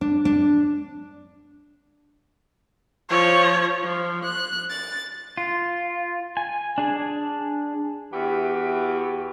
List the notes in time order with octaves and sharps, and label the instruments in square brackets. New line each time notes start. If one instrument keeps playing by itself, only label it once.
[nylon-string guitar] D4
D4
[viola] F3 [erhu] C#5
[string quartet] F3
F#6
A6
[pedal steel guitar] F4
G#5
D4 G#4
[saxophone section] E2 E3 F#4 G4